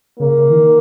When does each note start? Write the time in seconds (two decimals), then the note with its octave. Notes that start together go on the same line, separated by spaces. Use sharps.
0.19 C#3 A#3
0.38 C#3
0.50 E3
0.55 D#3